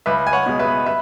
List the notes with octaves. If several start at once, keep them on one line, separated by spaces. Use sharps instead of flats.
C#2 B4 E5
G#5
C#5 F#5
B2 G#3
B4 E5
B4 E5